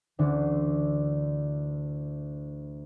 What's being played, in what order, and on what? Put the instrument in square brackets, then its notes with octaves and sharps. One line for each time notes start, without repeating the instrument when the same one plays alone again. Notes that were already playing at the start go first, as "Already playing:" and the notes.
[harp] D2 D3 E3 D4